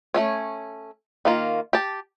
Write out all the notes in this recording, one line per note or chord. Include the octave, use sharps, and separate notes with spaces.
A3 C#4 C#5
D#3 A#3 F4
G4 A5